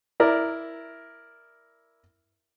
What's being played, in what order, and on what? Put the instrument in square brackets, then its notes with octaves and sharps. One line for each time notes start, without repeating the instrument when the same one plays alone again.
[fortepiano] E4 A#4 D5